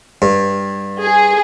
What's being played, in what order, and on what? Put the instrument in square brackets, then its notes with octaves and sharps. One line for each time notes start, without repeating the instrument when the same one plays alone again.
[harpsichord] G2
[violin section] G#4